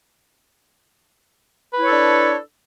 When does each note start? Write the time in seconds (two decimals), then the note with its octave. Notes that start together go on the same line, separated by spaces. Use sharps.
1.73 B4
1.77 E4
1.82 C#5
1.87 A4
1.91 D4